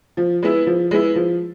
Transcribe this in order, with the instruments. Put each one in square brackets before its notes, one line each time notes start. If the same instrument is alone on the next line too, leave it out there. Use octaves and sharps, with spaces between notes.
[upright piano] F3
G#3 B3 E4
F3
G#3 B3 E4
F3